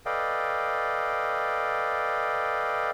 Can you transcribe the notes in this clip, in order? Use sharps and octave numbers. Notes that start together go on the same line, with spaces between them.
A4 B4 D5 D#5 F5 G5